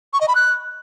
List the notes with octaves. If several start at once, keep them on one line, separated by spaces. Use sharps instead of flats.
C#6
D#5
B5
F#6